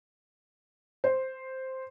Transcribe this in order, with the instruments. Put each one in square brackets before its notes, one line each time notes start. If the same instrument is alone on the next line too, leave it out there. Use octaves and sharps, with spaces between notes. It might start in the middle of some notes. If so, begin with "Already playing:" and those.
[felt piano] C5